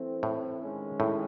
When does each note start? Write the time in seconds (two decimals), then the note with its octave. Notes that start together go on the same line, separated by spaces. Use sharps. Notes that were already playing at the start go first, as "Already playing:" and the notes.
Already playing: E3 A3 C4
0.23 A2
0.61 D#3 G#3 C#4
1.00 A2